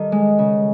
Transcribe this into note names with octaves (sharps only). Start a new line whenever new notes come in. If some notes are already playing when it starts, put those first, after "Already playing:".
Already playing: D#3 G3 A4
G#3
C#3